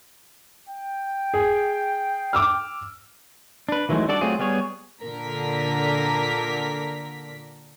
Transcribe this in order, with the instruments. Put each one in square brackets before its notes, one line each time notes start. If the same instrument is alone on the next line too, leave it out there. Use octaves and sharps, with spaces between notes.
[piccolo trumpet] G5
[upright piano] G#4
D6 E6 F6
[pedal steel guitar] D4 B4
D#3 E3 F#3 G#3 A3
G3 D4 F#4 A4 D5
F#3 A3 C4 F4 G#4
G3 B3 G#4 C#5
[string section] A#2 D3 A#4 B6